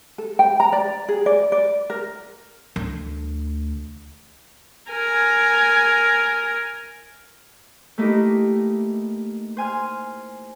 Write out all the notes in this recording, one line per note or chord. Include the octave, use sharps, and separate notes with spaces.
A4
G5
A#5
D5
G#4
D5
D5
A#4
D2
A#4 G#5
A3 A#3 D#4 E4 G4 D#5
C5 G#5 F6